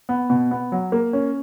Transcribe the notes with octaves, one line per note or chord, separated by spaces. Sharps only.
B3
B2
B3
F#3
A#3
C#4